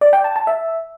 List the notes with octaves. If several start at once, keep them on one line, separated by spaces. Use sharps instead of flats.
D5
G5
A5
A5
E5